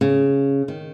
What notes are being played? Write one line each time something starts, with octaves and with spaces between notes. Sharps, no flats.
C#3
D#3